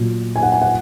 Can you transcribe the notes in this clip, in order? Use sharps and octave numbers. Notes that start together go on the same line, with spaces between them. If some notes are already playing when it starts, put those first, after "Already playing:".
Already playing: A#2 F#3
G#5
F#5
G#5
F#5